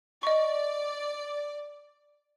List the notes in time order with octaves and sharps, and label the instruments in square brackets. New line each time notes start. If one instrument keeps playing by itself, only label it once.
[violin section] D5 [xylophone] D#5 C#6